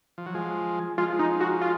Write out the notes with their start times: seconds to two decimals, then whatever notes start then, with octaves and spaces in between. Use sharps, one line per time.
0.18 F3
0.26 F#3
0.35 F3 G#3
0.98 F3 G#3 F4
1.19 D#4
1.40 F#4
1.61 F4